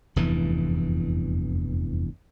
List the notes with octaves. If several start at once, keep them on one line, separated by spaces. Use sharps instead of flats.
F1 E2 G2 E3